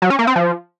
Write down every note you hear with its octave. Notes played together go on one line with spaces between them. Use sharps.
F#3
C#4
A#3
C4
F3